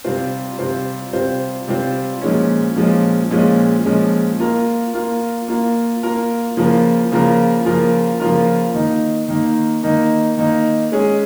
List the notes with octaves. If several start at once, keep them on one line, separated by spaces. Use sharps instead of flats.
C3 G3 C4 F4 C5
C3 G3 C4 F4 C5
C3 G3 C4 F4 C5
C3 G3 C4 F4 C5
A#2 F3 G#3 C#4
A#2 F3 G#3 C#4
A#2 F3 G#3 C#4
A#2 F3 G#3 C#4
A#3 F4 A#4
A#3 F4 A#4
A#3 F4 A#4
A#3 F4 A#4
C#3 F3 A#3 F4 A#4
C#3 F3 A#3 F4 A#4
C#3 F3 A#3 F4 A#4
C#3 F3 A#3 F4 A#4
D#3 A#3 D#4
D#3 A#3 D#4
D#3 A#3 D#4
D#3 A#3 D#4
G#3 C#4 G#4